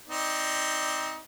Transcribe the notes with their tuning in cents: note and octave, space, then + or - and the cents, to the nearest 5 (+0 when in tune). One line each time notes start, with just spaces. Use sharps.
C4 +0 D#4 +25 D5 +15